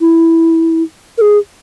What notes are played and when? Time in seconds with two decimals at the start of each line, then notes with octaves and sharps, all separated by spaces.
0.01 E4
1.18 A#4
1.21 G#4